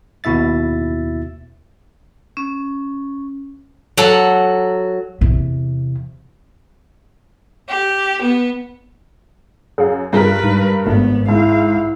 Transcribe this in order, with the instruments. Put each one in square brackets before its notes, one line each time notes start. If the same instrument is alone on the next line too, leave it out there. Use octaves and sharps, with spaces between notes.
[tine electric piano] D#2 B2 E4 E5 A6
[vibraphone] C#4
[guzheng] F#3 A4 F#5
[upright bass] E2 C3
[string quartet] G4
B3
[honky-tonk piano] F#2 [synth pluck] G#4 F5
[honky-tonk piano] G2 A#4 [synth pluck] F4 G#4 G#5 [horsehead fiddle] B4
[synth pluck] G#2
[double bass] G#1 [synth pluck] B2 A3 D4 [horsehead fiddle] B3
[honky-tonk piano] G#2 [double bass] E4 [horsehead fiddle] F5